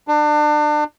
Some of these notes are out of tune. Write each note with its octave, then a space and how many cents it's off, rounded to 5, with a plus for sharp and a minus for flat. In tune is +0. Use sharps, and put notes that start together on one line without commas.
D4 +30